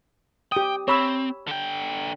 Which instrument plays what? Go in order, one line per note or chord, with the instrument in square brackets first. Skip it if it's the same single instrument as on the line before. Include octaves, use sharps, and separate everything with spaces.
[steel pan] G4 D#6 [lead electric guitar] G5
[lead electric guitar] C4 [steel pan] C#5 B5 E6
[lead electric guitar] D3 G5